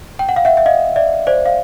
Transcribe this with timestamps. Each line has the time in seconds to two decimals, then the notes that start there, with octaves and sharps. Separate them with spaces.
0.19 G5
0.29 F#5
0.36 F5
0.45 E5 F#5
0.57 E5
0.66 D#5 F5
0.96 D5 E5
1.27 C5 D5
1.46 F5